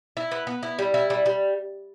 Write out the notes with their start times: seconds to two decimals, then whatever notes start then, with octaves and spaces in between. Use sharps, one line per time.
0.17 E4
0.31 B3
0.47 B3
0.63 E4
0.79 G3
0.94 E4
1.10 G3
1.26 G3